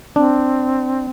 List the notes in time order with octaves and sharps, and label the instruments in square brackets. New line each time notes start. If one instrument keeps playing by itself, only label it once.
[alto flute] C4 [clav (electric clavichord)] D4